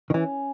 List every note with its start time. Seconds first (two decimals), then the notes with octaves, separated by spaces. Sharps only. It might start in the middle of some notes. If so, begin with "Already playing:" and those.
0.10 D#3
0.14 E3 C#4